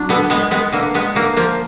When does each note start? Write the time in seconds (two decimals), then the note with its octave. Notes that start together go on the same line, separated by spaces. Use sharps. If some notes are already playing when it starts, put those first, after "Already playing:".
Already playing: F#3 D4
0.09 D3 B3
0.30 G#3 B3
0.51 G#3 B3
0.73 D3 A#3
0.94 G#3 B3
1.15 D3 A#3
1.37 F3 A#3